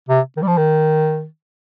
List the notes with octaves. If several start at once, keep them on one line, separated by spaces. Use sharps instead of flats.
C3
D#3
G3
F3
D#3